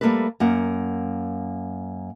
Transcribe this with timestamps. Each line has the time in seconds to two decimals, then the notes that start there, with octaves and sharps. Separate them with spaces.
0.01 G3 A3 A#3 G4 A4 B4
0.40 F#2 A#3 F#5